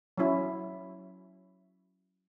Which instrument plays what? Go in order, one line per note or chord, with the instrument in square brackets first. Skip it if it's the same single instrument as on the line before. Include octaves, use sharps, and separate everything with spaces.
[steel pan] F#3 C#4 E4